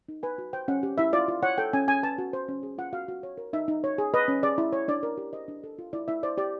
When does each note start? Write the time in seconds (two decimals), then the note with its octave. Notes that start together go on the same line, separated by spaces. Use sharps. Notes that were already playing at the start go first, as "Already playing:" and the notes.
0.09 D#4
0.23 B4 G#5
0.38 F#4
0.53 C5 G5
0.68 C#4 F#5
0.83 G4
0.98 E4 E5
1.13 F4 D5
1.28 F4
1.43 C#5 F#5
1.58 A4 G5
1.73 C#4 G#5
1.88 C#4 G#5
2.03 B4 A5
2.18 F#4
2.33 C5
2.48 C#4
2.63 G#4
2.78 F4 F#5
2.93 F#4 F5
3.08 F#4
3.23 C#5
3.38 A#4
3.53 D#4 E5
3.68 D#4
3.84 C#5
3.98 G#4
4.14 B4 D#5
4.28 C#4
4.43 G#4 D5
4.58 E4
4.73 C#5
4.88 D4 D5
5.03 A#4
5.18 G4
5.33 C5 D#5
5.48 D4
5.64 A4
5.79 F4
5.93 E4 D5
6.08 E4 E5
6.23 C5 D5
6.37 G4 D5